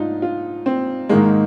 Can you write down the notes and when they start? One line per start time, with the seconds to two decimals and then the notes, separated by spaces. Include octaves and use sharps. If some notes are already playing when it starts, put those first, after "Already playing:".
Already playing: G#2 F3 D4 D#4 F4
0.22 F4
0.66 C4
1.09 G#2 D#3 G#3 A#3